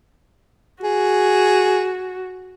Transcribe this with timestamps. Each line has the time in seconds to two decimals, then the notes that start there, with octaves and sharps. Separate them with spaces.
0.83 F#4 G#4